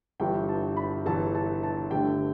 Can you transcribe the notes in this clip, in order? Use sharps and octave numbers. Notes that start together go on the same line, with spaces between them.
G1 G2 E3 G5
A5
B5
G1 G2 E3 A5
A5
A5
G1 G2 D3 A3 G5